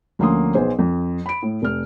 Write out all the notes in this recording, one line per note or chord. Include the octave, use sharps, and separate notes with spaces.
D2 F3 A#3 C#4 C6 D#6
B1 G#4 B4 C5
F2
B5 D7
A2
F1 F6